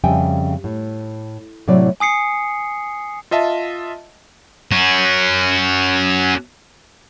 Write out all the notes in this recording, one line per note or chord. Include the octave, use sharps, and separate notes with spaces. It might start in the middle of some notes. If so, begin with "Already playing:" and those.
F2 C#3 G3 E5 G5 G#5
A2
A2 C3 F#3 E4 D5
G#5 D#6 C7 C#7
F4 D#5 E5 A5
C#4 F#4